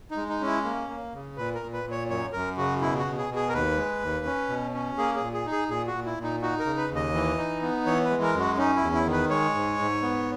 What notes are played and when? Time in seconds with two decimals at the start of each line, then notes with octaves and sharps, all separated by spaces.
0.11 D#4
0.17 G#3
0.29 D#4
0.41 C#4 E4
0.64 A#3
0.89 A#3
1.13 C#3
1.37 A#2 B4
1.55 A#4
1.61 A#2
1.73 B4
1.84 A#2
1.91 C#5
2.09 F#2 C#5
2.33 F#2 A#4
2.58 C#3 F#4
2.81 B2 E4
2.99 F#4
3.05 B2
3.17 G#4
3.30 B2
3.36 G#4
3.49 A#4
3.53 D#2 B4
3.77 G#3
4.02 D#2
4.26 C#4
4.49 B2
4.74 C#4
4.98 A#3 G#4
5.16 G#4
5.22 A#2
5.34 G#4
5.46 D#4
5.52 G#4
5.69 A#2 G#4
5.87 F#4
5.94 A#2
6.06 E4
6.18 A#2
6.23 D#4
6.42 D#4 F#4
6.59 A#4
6.66 C#3
6.77 B4
6.91 D#2
6.96 D#5
7.14 E3
7.38 D#4
7.62 B3
7.86 E3 C#5
8.05 B4
8.10 G#3
8.23 A#4
8.34 F#2
8.40 F#4
8.58 C#4 D#4
8.76 E4
8.82 E2
8.95 E4
9.06 D#3
9.13 B4
9.30 G#3 C#5
9.54 G#2
9.79 G#2
10.02 B3